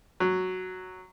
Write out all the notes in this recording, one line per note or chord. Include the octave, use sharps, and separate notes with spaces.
F#3